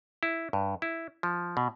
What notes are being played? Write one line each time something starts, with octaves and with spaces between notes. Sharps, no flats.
E4
G2
E4
F3
B2